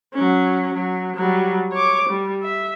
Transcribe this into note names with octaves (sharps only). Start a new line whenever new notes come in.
F#3 C#4
F#3
F#3 G3
C#5 D6
G3
E5